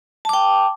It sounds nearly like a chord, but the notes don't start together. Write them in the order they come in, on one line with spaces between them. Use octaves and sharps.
A5 D6 G5